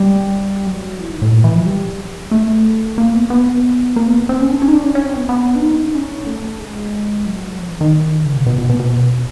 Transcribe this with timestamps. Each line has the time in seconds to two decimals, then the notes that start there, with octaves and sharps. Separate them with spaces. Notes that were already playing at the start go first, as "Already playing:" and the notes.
Already playing: G3
0.67 F#3
0.99 E3
1.10 D#3
1.22 A2
1.32 A#2
1.44 E3
1.55 F3
1.66 G3
2.31 A3
2.98 A#3
3.15 B3
3.30 B3
3.96 A#3
4.08 B3
4.18 A#3
4.29 C4
4.41 C#4
4.52 D4
4.62 C#4
4.68 D#4
4.73 D4
4.84 C#4
4.95 C#4
5.06 C4
5.17 B3
5.29 B3
5.56 D4
5.61 D#4
5.95 C#4
6.27 A3
6.60 G#3
7.26 F#3
7.59 F3
7.70 E3
7.81 D#3
8.25 C#3
8.36 B2
8.46 B2
8.58 B2
8.69 B2
8.80 B2